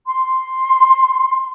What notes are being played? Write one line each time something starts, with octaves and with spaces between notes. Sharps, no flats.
C6